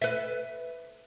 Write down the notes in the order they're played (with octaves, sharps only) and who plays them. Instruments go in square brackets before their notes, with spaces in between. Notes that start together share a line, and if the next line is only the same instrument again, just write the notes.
[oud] B4 E5